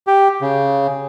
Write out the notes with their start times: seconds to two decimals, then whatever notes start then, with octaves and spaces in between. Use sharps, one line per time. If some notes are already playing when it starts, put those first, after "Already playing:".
0.07 G4
0.41 C#3